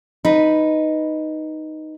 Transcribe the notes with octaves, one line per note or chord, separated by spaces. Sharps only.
D#4 B4